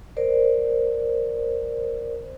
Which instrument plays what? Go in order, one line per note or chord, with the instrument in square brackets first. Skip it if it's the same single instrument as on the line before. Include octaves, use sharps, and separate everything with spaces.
[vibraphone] A#4 C5 D5